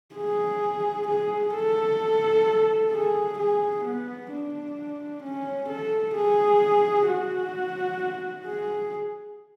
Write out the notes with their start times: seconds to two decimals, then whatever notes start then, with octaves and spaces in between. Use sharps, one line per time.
0.15 G#4
1.08 G#4
1.54 A4
2.92 G#4
3.39 G#4
3.84 B3
4.32 D4
5.23 C#4
5.70 A4
6.15 G#4
7.07 F#4
8.46 G#4